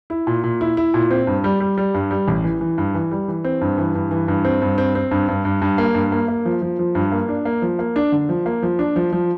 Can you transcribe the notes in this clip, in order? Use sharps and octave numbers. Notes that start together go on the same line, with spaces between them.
E4
A#2
A#2
E4
E4
A#2
C4
G2
G3
G3
G3
G2
G3
A1
E3
E3
G2
E3
G3
E3
C4
G2
E3
G2
E3
G2
C4
G2
C4
C4
G2
G2
G2
G2
A#3
G2
A#3
A#3
F3
F3
F3
G2
A#3
D4
A#3
F3
A#3
D4
D3
F3
A#3
F3
D4
F3
F3